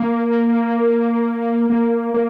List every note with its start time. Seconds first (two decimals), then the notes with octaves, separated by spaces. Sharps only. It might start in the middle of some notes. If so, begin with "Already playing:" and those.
Already playing: A#3
1.70 A#3
2.14 A#3